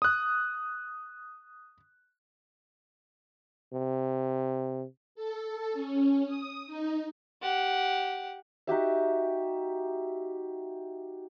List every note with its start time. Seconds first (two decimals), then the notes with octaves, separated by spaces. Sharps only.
0.02 D#6 F#6
3.73 C3
5.15 A4
5.73 C#4
6.26 D#6
6.67 D#4
7.42 G4 F#5
8.67 D#4 F#4 G4 E5